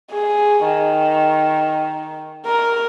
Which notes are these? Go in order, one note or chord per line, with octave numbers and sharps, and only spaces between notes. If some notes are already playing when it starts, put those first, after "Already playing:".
G#4
D#3
A#4